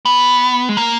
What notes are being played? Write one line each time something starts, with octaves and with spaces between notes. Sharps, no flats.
B3
G#3
A#3